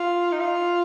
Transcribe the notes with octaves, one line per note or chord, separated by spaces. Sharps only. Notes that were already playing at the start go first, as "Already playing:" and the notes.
Already playing: F4
D#4
F4